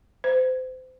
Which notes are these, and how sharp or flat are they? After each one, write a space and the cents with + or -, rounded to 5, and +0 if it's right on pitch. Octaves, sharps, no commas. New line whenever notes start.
C5 -30